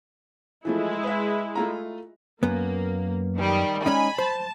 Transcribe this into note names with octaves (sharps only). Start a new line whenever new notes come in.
E3 F3 G#3 A3 E4
B4 E5
A3 F4 A#5
F#2 A#3 B3
D#3 G3
G#3 C#4 D#4 G#5 B5
C5 A5